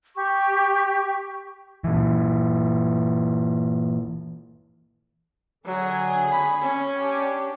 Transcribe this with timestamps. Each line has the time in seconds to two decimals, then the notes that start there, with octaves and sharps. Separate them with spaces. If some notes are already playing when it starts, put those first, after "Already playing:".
0.15 G4 C#6
1.84 A#2 E3
5.65 D3 F#3 G#4
6.31 B5
6.62 C#4
6.96 D4 G4